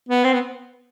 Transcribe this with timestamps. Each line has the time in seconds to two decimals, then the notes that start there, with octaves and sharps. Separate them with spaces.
0.09 B3
0.24 C4
0.33 B3